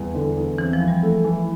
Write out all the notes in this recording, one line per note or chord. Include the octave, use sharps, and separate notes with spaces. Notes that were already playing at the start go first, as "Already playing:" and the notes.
Already playing: E2 G3
D3
E2
E3 C4
F3
E3
G3
A3
E3